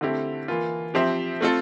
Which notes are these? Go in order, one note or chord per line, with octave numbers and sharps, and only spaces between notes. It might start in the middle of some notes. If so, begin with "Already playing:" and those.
D3 A3 C4 E4 G4
E3 A#3 F4
F3 C4 G4 C5 E5
A3 C4 F4 A4